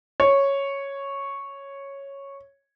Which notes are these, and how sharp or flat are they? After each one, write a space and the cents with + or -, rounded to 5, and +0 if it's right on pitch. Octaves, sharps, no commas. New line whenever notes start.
C#5 -5